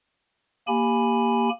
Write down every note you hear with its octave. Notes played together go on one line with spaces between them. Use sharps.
A#3 G4 G#5 B5